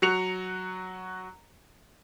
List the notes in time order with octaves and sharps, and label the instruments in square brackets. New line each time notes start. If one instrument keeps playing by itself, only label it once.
[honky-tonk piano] F#3 F#4 C#7 F7